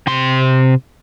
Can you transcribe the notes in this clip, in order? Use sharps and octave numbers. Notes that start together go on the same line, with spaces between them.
C3 C6